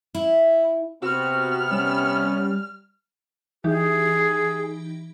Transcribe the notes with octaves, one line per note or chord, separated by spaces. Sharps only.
E4
C3 B3 C4 F#4 F6
G3 C#4
E3 D#4 G4 G#4